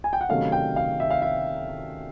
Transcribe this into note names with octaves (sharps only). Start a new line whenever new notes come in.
G#5
G5
F#5
C3 D#3 F#3 A3 C#4 F5
G5
F5
E5
F5
E5